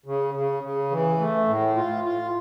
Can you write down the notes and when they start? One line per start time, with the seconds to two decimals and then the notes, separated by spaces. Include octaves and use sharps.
0.06 C#3
0.34 C#3
0.63 C#3
0.91 E3
1.19 A3
1.47 A2
1.76 F4
2.04 F4